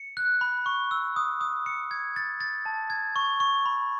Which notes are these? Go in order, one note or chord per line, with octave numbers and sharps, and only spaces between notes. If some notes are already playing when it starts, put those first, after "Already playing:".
Already playing: C#7
F#6
B5
C#6
E6
D#6
D#6
C#7
G#6
A6
A6
A5
G#6
C#6
C#6
B5